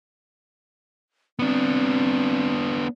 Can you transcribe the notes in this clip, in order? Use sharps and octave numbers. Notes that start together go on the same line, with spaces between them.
B3 C4 D4